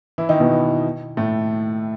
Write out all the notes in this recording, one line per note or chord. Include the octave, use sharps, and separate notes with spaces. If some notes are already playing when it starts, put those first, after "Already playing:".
E3 E4
D#3 D#4
B2 B3
A2 A3